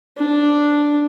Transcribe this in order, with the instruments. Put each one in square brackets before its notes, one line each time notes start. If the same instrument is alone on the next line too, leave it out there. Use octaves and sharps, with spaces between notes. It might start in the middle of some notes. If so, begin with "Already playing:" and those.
[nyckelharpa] D4